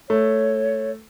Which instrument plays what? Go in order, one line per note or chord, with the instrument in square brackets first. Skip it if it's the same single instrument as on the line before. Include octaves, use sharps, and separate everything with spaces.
[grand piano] A3 [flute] C#5